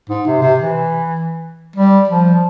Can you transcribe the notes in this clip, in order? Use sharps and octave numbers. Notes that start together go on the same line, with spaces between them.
G#2
C3
C3
E3
G3
F3